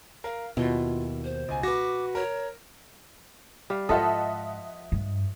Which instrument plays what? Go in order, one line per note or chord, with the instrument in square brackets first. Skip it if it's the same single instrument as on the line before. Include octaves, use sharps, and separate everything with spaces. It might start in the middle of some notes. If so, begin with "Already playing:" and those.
[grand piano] A#4 [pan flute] F5
[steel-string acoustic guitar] D#2 [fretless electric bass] B2 [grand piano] E4 [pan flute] F4
[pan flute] C5
[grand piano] C#2 G#5
[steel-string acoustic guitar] F#4 B4 [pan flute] D6 [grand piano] A#6
[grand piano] A#4 [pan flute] C#5
[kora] G3 F5
[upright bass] G#2 [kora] F3 F4 A4 [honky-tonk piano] D#5 E5 F#5
[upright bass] G2